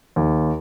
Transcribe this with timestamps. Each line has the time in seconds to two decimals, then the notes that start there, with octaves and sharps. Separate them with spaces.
0.16 D#2